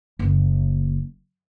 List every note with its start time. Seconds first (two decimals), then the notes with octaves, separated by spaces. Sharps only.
0.19 F#1 A#3